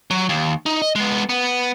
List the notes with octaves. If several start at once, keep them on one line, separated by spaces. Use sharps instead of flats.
F#3
D#2
D#4
D#5
G#3 B3
B3